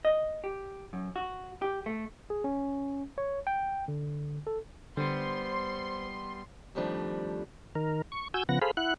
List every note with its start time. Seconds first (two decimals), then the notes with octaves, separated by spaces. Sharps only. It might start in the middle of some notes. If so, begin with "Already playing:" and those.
0.05 D#5
0.44 G4
0.93 F#2
1.16 F#4
1.62 G4
1.86 A3
2.30 G#4
2.44 C#4
3.18 C#5
3.47 G5
3.88 D3
4.47 A4
4.97 D3 G3 B3 C5 C6
6.75 F2 D#3 F3 G3 A3 D4
7.75 D#3 A#4
8.12 C#6
8.34 F#4 G#5 E6 G6
8.49 C#3 F3 B3 F#5 A#6
8.62 G#4 A4 C5 F5 B5
8.77 E4 F#5 F#6